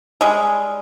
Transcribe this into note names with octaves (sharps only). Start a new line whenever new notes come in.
G3 G#3